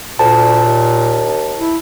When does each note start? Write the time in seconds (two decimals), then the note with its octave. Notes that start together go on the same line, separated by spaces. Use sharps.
0.19 D2 A#2 A5
0.65 D#2
1.58 E4